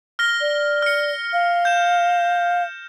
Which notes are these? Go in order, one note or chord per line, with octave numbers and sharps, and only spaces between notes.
F6 A#6 G7
D5
F6 C#7
F5
G6 E7